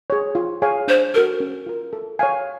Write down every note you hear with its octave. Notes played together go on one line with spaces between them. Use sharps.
G#4 C#5
F4
G#4 C#5 F5 G#5
D4 C5
F#4 A4 A#4
C#4
F4 A#4
A4
C#5 F5 G#5